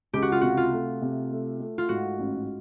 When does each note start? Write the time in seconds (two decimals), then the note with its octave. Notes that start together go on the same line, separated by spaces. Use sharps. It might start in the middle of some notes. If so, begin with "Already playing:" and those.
0.13 C#2 G4
0.22 F#4
0.32 F4
0.41 C3 F#4
0.57 F4
0.72 A3
1.01 C3
1.31 A3
1.60 A3
1.78 F4
1.89 G#2 F#4
2.19 A1